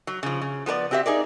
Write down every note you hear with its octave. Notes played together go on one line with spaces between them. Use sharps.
F#3
C#3 F3
C#3
F3 B3 A#4 D5
C4 F#4 G4 C#5 E5
D#4 G#4 A#4 D5